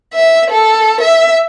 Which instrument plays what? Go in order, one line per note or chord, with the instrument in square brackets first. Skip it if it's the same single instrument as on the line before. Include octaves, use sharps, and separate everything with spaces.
[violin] E5
A4
E5